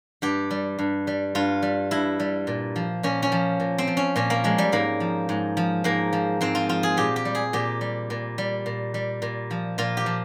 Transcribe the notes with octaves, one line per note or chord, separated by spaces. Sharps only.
G2 G4
G3
G2
G3
G2 F4
G3
G2 E4
G3
A#2
F3
A#2 C#4
C#4
F3
A#2
C4
F3
C#4
A#2 C#4
A#3
F3 G#3
G3
G#2 A#3
F3
G#2
F3
G#2 A#3
F3
G#2 C4
F4
F3 F4
G#4
A#2 G4
G4
G3
G#4
A#2 G4
G3
A#2
G3
A#2
G3
A#2
F3
A#2 F4
G4
F3